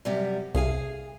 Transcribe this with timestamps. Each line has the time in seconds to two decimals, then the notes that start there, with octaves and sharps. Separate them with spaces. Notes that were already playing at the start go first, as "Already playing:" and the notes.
0.05 F#2 C3 G3
0.55 C2 G#4 F5 G#5